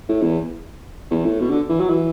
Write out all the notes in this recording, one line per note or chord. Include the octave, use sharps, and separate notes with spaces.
A2
E2
E2
A2
B2
D3
E3
F#3
E3